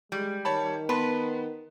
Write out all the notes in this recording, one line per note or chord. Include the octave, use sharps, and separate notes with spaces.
G3 G#3
D#3 C#5 A5 B5
B3 B4 A5 C6